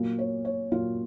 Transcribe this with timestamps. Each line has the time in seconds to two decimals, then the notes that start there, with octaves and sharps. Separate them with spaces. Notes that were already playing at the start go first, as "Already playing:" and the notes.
Already playing: A#2 F#3 A#3
0.19 C#5
0.45 C#5
0.72 A#2 F#3 A#3 F4